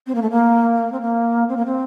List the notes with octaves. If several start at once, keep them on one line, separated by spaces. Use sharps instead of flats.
C4
A#3
A3
A#3
C4
A#3
C4
A#3
C4